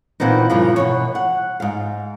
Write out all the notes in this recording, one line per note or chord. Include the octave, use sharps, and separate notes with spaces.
A#2 E3 B3 C4 D#4
G2 A#2 C#3 F3
B2 E3 C#5
F#5
G#2 F5